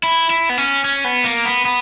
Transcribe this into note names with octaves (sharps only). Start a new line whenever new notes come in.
E4
E4
B3
C#4
C#4
B3
A#3
B3
B3